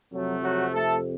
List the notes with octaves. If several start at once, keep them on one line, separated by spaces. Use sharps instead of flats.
F2 C3 F#3 A3
F#3 F#4
A3 A4